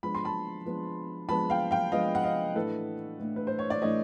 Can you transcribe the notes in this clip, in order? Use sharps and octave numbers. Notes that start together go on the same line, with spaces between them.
F3 G#3 B3 D4 B5
C6
A5 B5
F3 G#3 B3 D4
F3 G#3 B3 D4 A5 B5
F5 G5
F5 G5
F3 G#3 B3 D4 D#5 F5
F#5
D#5 F5
A2 E3 A3 D4 A4 B4
A2 E3 A3 D4
B4
C5
C#5
D5
A2 E3 A3 D4 C#5 D#5